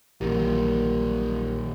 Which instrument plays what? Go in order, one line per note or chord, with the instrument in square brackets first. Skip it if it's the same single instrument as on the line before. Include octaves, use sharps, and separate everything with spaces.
[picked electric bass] A#1 D#3 [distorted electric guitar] D#2 A#2 [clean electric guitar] E3 F#3 [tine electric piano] G4 A#4